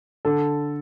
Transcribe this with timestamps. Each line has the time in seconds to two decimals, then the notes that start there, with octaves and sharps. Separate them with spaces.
0.25 D3 A4